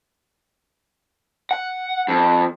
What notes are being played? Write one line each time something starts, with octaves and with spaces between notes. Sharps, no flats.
F#5
F2